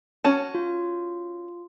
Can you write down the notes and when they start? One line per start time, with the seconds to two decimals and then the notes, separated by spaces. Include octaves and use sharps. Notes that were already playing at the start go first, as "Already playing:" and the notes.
0.24 C#4 F#4 A5
0.55 F4